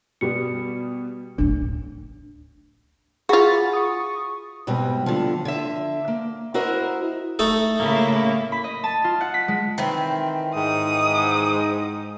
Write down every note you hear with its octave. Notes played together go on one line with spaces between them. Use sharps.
B2 G3 B3 F#4 C#7
A1 D2 D4
F4 F#4 G#4 B5 A6
C#6 D#6
G#2 B2 G3 C4
D3 F3
D3 E5
A#3
E4 F#4 A#4 C5 D#5 E5
A3 D#4 A4
A2 C#3 A#3 E4
B5
D#5
A5
F4
F#5
B6
G#3
D#3 E3 C4
G#2 D#4 D#6